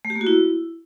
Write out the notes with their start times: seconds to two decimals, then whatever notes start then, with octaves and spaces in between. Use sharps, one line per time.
0.05 A3
0.10 G4
0.16 A#3
0.21 F#4
0.27 E4